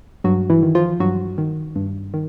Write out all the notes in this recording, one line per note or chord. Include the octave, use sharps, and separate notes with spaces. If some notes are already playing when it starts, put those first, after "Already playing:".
G2 F#3 F#4
E3 E4
D#3
F3 F4
G2 F#3 F#4
D#3
G2
D#3